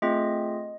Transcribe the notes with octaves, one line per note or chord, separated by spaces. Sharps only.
A3 C4 F4 G#4 D#5